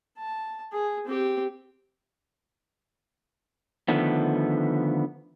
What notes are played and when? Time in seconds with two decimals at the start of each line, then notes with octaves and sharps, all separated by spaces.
0.18 A5
0.73 G#4
1.06 C4 G4
3.88 D3 D#3 F3 A3 B3